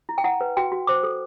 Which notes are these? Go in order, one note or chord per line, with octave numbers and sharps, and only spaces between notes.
E4
G5
E4 F#5
B4
F#4 G5
F#4
C5 D6
A4